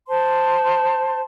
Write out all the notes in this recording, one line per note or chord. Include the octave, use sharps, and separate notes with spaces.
C5 A5 C6